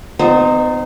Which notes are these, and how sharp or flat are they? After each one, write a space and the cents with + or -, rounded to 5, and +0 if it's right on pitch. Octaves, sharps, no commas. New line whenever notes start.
B3 +40 D#4 -20 C5 +0